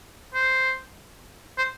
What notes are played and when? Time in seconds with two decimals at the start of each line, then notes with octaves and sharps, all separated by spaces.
0.34 C5
1.58 C5